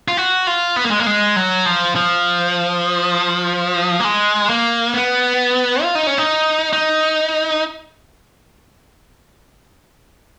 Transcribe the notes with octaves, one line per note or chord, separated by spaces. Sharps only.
F4
F#4
F4
B3
A#3
G#3
A#3
G#3
F#3
F3
F3
A#3
G#3
A#3
B3
F4
D#4
C#4
D#4
D#4